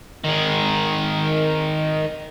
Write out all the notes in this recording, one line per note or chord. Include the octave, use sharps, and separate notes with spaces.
D#3 G#4